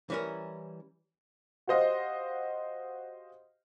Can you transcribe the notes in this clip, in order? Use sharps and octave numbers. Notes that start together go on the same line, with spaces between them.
E3 G3 C#4 E4 A#4
F#4 G4 C5 D#5 F5 F#5